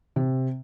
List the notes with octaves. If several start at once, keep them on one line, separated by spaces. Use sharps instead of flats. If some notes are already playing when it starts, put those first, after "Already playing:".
C3